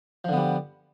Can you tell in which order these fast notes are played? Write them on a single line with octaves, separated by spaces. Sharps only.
F3 D3 B3 G3